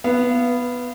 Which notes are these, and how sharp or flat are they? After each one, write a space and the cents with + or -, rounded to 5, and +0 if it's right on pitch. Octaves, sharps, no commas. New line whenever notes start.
B3 +0 F5 -30